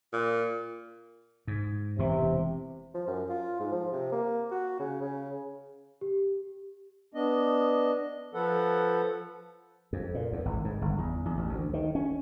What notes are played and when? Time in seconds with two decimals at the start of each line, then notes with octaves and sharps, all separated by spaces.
0.13 A#2
1.48 G#2
1.99 E1 C3 E3
2.94 F3
3.07 F#2
3.29 F4
3.60 G#2
3.72 F3
3.92 C3
4.12 A#3
4.51 F#4
4.79 C#3
5.01 C#3
6.01 G4
7.14 B3 D4 D#5
8.34 F3 A4 B4 F#5
9.93 F2
10.15 A#2
10.32 E2
10.45 G#1
10.65 G#2
10.81 G1
10.98 E2
11.26 E2
11.37 A1
11.49 D2
11.73 D#3
11.95 C#4